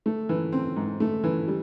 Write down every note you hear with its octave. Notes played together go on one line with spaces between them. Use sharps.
A3
E3
C4
G#2
A3
E3
G3